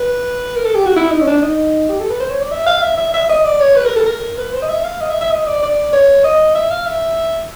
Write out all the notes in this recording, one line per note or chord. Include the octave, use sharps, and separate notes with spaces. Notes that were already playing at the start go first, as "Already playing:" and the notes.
Already playing: B4
A#4
A4
G4
F#4
E4
D#4
C#4
D4
D#4
G4
A4
B4
C5
C#5
D5
E5
F5
E5
E5
E5
D#5
D5
C#5
B4
A#4
A4
A#4
B4
C5
D#5
E5
F5
D#5
E5
E5
D#5
D5
D5
C#5
D#5
E5
F5
E5